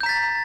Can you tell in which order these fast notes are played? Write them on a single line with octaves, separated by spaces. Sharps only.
G6 A#5 B6 A6